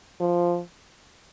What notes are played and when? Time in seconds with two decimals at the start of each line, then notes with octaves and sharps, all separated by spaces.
0.20 F3